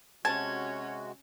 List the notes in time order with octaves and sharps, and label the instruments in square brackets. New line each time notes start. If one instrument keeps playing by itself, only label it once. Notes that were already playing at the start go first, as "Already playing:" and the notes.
[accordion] C3 G#3 F#4 [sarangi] C#4 [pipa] A5 [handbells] G#6